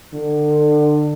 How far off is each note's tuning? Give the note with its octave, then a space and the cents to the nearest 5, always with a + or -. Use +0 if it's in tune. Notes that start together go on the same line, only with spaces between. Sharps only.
D3 +30